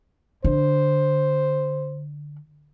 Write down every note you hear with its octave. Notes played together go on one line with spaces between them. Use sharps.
D3 C5